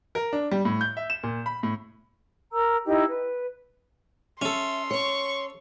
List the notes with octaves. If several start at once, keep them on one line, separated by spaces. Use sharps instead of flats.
A#4
D4
G3
A2
G6
E5
E7
A#2
B5
A2
A#4 A#5 E6
D#4 E4 G4 D#5
B4
C#4 A4 E5 C6
C#5 C#6 C#7